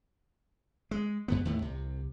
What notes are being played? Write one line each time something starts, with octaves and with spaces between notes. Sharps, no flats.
G#3
G2 D3 B3
D#2 A2 D3 A3
C2 C3